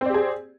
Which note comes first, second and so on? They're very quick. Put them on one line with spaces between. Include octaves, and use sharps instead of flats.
C4 D5 G4 G#4